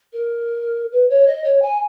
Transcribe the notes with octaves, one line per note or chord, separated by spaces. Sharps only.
A#4
B4
C#5
D#5
C#5
G#5